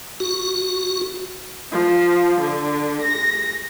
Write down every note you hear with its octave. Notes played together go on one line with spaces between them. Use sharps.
F#4
F3
D3
A#6